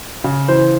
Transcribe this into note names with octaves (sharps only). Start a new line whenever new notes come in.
C#3
E3 C5